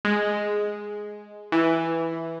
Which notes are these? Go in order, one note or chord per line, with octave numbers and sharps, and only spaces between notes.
G#3
E3